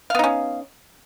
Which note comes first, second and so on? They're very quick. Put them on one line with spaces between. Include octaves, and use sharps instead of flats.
F5 B3 D#4 C#4